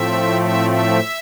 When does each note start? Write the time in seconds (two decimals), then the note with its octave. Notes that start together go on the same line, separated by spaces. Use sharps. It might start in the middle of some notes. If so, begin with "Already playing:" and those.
Already playing: A2 F3 A3 C4 E5
0.42 E5
0.70 E5